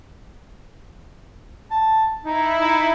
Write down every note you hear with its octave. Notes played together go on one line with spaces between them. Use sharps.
A5
D#4 E4
D#4